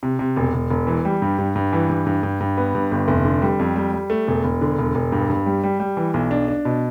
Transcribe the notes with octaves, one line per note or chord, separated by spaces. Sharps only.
C3
C3
E1
E1
E1
E3
G3
G2
G2
G2
E3
G2
G2
G2
G2
B3
G2
G1
F1
D3
G3
F2
G3
G3
A3
E1
E1
D3
E1
E1
G2
G2
G3
G3
G3
E3
B1
D4
D4
B2